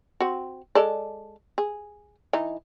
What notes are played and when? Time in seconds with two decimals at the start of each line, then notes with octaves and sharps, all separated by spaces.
0.20 C4 F#4
0.75 G#3 A4 D5
1.58 G#4
2.33 E3 D#4